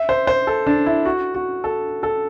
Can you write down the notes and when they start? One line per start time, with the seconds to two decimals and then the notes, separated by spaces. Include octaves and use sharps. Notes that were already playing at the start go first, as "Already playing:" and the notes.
Already playing: E5
0.09 C5
0.27 C5
0.47 A4
0.67 D4
0.86 E4
1.05 F#4
1.35 F#4
1.64 A4
2.03 A4